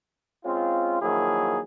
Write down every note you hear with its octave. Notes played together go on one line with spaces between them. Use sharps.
G#3 C4 C#4 F4
D#3 F3 F#3 A#3 E4 G#4